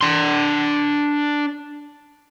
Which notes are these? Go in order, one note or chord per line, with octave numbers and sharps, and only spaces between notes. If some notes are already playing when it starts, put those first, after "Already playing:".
D4 C6